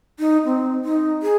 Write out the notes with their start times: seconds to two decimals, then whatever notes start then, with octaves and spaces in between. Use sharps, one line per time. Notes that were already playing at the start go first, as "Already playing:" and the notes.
0.19 D#4
0.45 C4
0.84 D#4
1.23 G#4